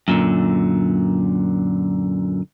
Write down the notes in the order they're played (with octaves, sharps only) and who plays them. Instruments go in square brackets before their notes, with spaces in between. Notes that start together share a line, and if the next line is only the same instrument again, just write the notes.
[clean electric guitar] F#2 A#2 D3